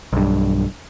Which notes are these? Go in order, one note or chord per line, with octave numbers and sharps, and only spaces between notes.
B1 G2